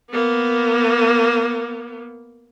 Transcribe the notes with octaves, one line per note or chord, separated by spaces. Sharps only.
A#3 B3